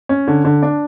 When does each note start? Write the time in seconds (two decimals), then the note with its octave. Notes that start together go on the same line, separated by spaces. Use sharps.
0.09 C#4
0.28 D3
0.45 D3
0.62 D4